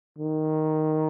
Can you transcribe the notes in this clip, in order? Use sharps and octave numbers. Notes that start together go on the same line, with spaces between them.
D#3